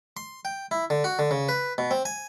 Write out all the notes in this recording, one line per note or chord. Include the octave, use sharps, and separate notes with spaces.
C6
G5
E4
D3
F#4
D3
C#3
B4
B2
C4
G#5